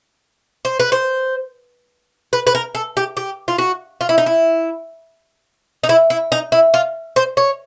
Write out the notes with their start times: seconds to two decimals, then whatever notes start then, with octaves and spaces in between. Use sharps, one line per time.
0.65 C5
0.79 B4
0.92 C5
2.33 B4
2.47 B4
2.55 A#4
2.75 A4
2.97 G4
3.17 G4
3.48 F4
3.58 F#4
4.01 F4
4.09 E4
4.18 D#4
4.26 E4
5.83 D#4
5.89 E4
6.10 E4
6.32 D#4
6.52 E4
6.74 F4
7.16 C5
7.37 C#5